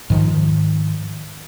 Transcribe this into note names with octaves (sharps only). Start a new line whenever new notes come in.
G#2 D#3 F3